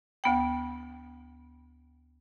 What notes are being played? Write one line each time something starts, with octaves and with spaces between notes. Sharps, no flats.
D2 B3 G5